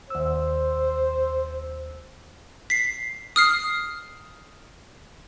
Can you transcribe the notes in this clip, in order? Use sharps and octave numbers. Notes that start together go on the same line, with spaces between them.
D#2 C5 E6
B6 C7
D#6 F6 C7